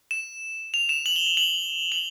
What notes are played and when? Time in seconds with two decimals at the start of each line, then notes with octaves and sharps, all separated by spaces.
0.11 E7
0.74 F7
0.89 E7
1.06 F#7
1.16 G7
1.26 F#7
1.37 F#7
1.92 F#7